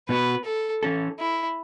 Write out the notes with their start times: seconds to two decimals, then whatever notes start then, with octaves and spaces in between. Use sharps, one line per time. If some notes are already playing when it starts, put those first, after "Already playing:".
0.09 B2 B3 F#4 B4
0.45 A4
0.83 E3 C#4 A4
1.19 E4